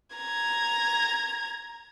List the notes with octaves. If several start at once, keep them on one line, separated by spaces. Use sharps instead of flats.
A#5 G#6